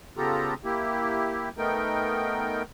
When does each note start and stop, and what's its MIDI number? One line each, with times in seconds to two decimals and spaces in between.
0.17 0.54 49
0.17 0.54 59
0.17 0.54 65
0.17 0.54 67
0.17 0.54 69
0.17 0.54 82
0.64 1.49 58
0.64 1.49 64
0.64 1.49 67
1.58 2.63 57
1.58 2.63 59
1.58 2.63 63
1.58 2.63 70
1.58 2.63 79